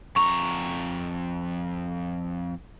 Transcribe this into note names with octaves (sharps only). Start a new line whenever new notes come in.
F2 A#5 C#6